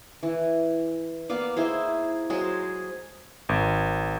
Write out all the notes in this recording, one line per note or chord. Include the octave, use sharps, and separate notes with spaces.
E3
A#3 B3 D5 F5
D#4 E4 G#4 C5
F#3 G#3 G#4 C5
G#1